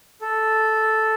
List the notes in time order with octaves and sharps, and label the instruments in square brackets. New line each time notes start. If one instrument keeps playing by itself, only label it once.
[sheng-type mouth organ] A4